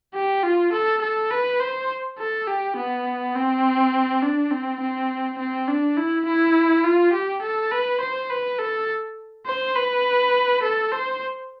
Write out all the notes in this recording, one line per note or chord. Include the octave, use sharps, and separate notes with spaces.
G4
F4
A4
A4
B4
C5
A4
G4
B3
C4
D4
C4
C4
C4
D4
E4
E4
F4
G4
A4
B4
C5
B4
A4
C5
B4
A4
C5